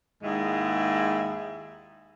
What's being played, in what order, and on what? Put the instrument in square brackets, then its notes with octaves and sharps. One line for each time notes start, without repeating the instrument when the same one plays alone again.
[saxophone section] D#2 G#2 G#3 E4